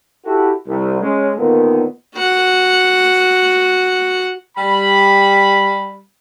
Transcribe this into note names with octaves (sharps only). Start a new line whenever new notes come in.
E4 F#4 G4 A4
C2
G#3 C#4
A#2 D3 D#3 B3
F#4 F#5
G3 B5